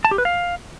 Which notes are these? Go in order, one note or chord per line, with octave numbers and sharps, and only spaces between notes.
A5
G4
B4
F5